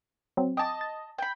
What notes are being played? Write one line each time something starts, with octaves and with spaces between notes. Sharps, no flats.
F#3 C4
D#5 G5 A5 D6
A6
G5 B5